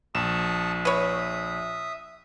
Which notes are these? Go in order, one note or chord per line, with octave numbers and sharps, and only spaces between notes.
A#1 A5 C#6 D#6 E7
B4 C#5 E5 D#6